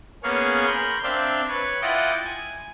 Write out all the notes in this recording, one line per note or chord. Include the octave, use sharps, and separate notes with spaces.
A#3 B3 C#4 G#4 C#5 F5
A#4 B5 C6 G6
C4 D4 D5 E5 F5 G5
B4 C#5
E4 F4 D5 D#5 F#5 G5
G#5